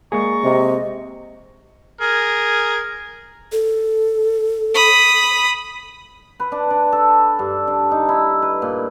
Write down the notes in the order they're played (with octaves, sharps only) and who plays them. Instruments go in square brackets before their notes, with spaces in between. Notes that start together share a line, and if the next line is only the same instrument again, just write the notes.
[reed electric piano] G#3 A#3 G#4 [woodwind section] D5 A#5 C#6
[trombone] C3 [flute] D#5
[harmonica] G#4 A#4
[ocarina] A4
[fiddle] B5 D#6
[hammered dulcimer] B4
D4
D4
A4
G2
D4
D#4
E4
B4
A#2